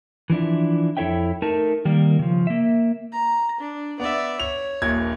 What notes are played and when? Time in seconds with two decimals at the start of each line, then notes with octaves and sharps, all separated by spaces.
0.30 E3 F3 D4 E4
0.97 F2 E4 A4 C#5 E5 G5
1.42 A3 D#4 A#4 A5
1.85 D#3 G3 A#3 A#4
2.19 C#3 F3
2.47 A#3 E5
3.12 A#5
3.60 D4
4.00 B3 D5 E5
4.40 C#5 F7
4.82 D#1 A#1 G#6